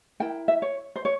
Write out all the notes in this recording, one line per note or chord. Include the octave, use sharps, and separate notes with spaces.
E4 A#4 G5
E5
C#5
C5
C#5